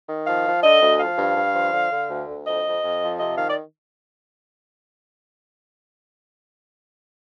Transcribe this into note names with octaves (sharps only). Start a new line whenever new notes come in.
D#3
F3 F5
F3
D3 D#5
D2
F3 F5
G2
G2
F3
D3
D3
D2
D2
F2 D#5
F2
F2
F3
C3 D#5
D#3 F5
D5